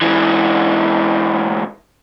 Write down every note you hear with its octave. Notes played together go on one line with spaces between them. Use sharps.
G#2 E3